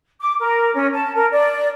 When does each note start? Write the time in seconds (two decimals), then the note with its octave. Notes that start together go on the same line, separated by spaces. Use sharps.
0.20 D6
0.40 A#4
0.75 C#4
0.92 A5
1.15 A#4
1.32 D5